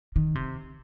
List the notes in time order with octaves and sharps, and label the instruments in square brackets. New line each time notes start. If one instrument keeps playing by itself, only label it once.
[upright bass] D#3
C3